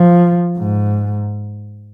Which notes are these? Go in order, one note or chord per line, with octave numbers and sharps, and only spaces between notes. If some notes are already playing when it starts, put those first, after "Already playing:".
Already playing: F3
G#2